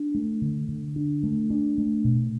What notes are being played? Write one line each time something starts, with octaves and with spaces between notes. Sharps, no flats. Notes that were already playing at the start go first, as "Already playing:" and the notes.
Already playing: D4
A3
D3
D3
D4
A3
D4
A3
B2